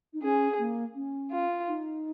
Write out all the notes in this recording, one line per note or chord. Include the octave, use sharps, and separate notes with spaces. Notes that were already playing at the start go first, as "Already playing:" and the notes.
D#4
C#4 G#4
A#3
C#4
F4
D#4